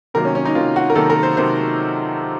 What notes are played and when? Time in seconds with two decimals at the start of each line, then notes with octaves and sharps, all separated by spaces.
0.14 C3 D#3 F#3 A#3 A#4
0.25 C#4
0.35 C#4
0.45 D#4
0.55 C3 D#3 F#3 A#3 F4
0.76 F#4
0.90 A#4
0.95 C3 D#3 F#3 A#3 A4
1.10 A#4
1.23 C5
1.37 C3 D#3 F#3 A#3 C5